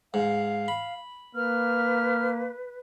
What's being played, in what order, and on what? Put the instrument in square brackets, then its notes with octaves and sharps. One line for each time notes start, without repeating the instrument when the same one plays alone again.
[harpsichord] G#2 [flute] F5
[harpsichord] B5
[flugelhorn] A#3 [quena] B4 [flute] F6